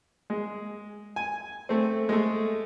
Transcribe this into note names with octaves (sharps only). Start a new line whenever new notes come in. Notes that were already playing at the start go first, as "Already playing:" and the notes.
G#3
G#5
A3 C4
G#3 A3